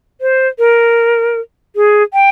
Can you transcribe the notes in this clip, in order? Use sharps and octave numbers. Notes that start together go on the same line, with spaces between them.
C5
A#4
G#4
G5